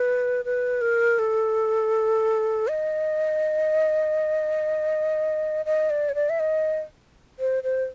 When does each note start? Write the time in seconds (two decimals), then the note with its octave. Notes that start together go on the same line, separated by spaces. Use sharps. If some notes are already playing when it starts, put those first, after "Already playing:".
Already playing: B4
0.45 B4
0.81 A#4
1.19 A4
2.68 D#5
5.66 D#5
5.90 D5
6.09 C#5
6.15 D5
6.30 E5
6.40 D#5
7.39 C5
7.63 C5